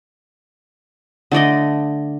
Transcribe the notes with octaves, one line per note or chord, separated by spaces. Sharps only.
D3 A3 D5 D#5